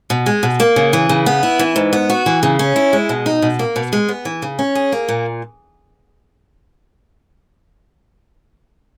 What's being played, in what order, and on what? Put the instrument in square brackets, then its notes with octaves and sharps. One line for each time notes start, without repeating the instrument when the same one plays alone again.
[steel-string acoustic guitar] B2
G#3
B2
A#3
C#3
E3
C#3
B3
E4
E3
G#2
B3
F#4
E3
C#3
C#4
E4
G#3
B2
D#4
B2
A#3
B2
G#3
B3
E3
C#3
C#4
G#4
A#3
A#2